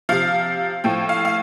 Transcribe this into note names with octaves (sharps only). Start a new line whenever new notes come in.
C3 F3 F5
A2 F3 G5
F5
F5